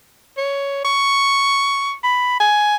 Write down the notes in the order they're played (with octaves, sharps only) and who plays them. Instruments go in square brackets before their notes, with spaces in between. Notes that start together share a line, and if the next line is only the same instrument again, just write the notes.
[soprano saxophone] C#5
C#6
B5
G#5